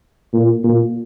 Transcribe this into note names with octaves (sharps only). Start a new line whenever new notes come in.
A#2
A#2